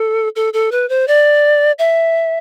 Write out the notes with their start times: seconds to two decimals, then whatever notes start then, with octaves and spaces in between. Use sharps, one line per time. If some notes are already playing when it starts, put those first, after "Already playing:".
Already playing: A4
0.36 A4
0.53 A4
0.72 B4
0.89 C5
1.08 D5
1.79 E5